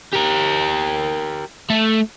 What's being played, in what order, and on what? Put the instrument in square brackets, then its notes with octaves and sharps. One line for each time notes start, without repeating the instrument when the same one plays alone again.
[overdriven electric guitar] G4 A#4
A3